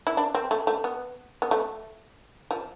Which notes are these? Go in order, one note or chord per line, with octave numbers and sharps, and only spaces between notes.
E4
D4
C4
A3
A3
B3
B3
A3
F3